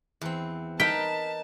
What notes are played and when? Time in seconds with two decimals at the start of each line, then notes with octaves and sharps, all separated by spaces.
0.21 E2 C4
0.80 D#4 A#4 B4 G5 A5 B6